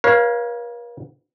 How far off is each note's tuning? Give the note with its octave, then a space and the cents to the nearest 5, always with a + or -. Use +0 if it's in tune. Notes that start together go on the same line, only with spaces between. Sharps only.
A#4 +45 C#5 -10 F5 +0